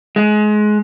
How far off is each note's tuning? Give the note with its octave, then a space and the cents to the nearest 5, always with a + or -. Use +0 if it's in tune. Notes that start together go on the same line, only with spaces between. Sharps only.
G#3 +25